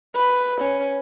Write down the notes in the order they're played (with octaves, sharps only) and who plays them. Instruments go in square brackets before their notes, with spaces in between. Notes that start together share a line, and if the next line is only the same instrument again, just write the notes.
[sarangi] B4
C#4